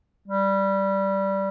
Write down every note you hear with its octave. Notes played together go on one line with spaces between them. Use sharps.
G3